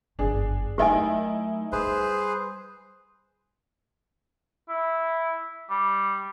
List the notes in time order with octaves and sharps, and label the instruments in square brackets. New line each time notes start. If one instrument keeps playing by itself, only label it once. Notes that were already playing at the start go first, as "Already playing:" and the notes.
[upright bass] G1 F#2 [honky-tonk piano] D4 G#4
[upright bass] F#3 A3 [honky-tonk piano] D#4 E4 A#4 [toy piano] G4 D#5 G#5
[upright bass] G3 [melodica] G#4 B4 C5
[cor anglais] E4
G3